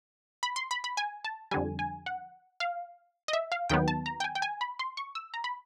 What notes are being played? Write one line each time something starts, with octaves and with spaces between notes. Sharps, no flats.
B5
C6
B5
B5
G#5
A5
F2 D3 G3 G#5
G#5
F#5
F5
D#5
E5
F5
D#2 D#3 F#3 B3 G5
A5
A#5
G5
G#5
G5
G#5
B5
C6
C#6
E6
A#5
B5